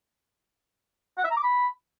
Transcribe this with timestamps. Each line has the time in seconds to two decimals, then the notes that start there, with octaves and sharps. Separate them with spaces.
1.18 F#5
1.24 E5
1.31 A#5
1.37 D6
1.43 B5